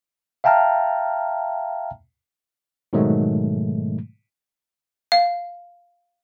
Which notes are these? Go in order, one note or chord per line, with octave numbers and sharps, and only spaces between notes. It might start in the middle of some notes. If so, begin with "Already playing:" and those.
E5 F5 G5 A5 A#5 F6
G#2 B2 D#3 F#3 G#3 A3
F5